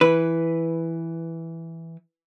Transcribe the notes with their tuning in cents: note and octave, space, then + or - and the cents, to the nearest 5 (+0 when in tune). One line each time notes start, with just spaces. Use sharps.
E3 +0 B4 +0